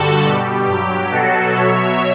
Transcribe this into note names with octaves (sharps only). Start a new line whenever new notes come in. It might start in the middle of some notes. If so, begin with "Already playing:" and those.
Already playing: G2 D3 G3 F#4 A4
B2 G3 G4
G2 F#3 G4
B2 F#3 F#4 A4
B2 F#3 C#5 E5